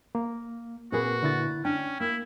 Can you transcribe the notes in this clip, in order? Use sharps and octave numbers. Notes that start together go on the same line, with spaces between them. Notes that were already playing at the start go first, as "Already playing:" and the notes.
A#3
A#2 C4 F#4 G#4 B4
D3 E4 A6
C#4 D4 G5
A#3 E4